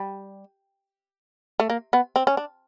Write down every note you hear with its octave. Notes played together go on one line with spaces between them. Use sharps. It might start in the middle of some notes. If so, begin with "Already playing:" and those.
Already playing: G3
A3
A#3
B3
C4
C#4
D4